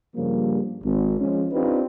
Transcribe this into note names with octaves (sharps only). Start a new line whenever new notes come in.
G2 C#3 F3 G3 A#3
G#1
F3 G#3 C#4
C4 D4 D#4 F4 G4 B4